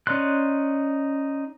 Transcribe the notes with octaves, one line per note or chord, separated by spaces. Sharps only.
C#4 D#4 D5 C6 F#6